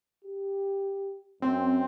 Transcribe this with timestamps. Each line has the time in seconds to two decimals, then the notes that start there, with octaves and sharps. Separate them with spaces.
0.24 G4
1.42 F#2 C4